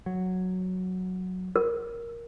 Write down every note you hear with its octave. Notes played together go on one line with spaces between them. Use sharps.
F#3
A#4